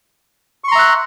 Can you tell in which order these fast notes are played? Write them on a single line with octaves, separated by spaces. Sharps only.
C#6 C6 A#5 E5 F#6